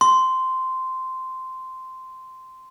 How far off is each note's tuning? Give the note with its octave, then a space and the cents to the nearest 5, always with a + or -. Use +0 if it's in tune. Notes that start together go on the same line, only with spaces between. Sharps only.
C6 -10